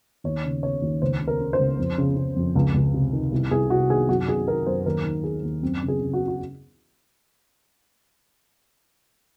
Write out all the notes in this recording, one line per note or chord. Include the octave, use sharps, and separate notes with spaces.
D#2 C#5
C#3
C#3 C#5
D#2
C#2 C5
C#3
A#4
C#3
C5
C#2
F2
C#3
C#3
F2
C#2
C#2
C3
D#3
C2
C2 G#4
C3 F#4
D#3 G#4
F#2 F#4
D#3 G#4
D#3 A#4
F#2 C5
D#2 A#4
D#3
D#3 G#4
D#2
F#2 C4
C#3
G#4
C#3
F#4
F#4